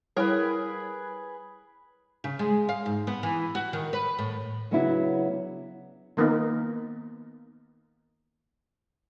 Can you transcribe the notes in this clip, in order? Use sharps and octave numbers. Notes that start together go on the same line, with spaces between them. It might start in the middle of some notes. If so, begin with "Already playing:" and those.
G3 E4 G#4 A#4 B4 C#5 G5
C#3
G#3
F5
G#2
B3
E3
F#4
D#3
B4
A2
C#3 F#3 B3 D4 E4 F#4
D#3 A#3 B3 D#4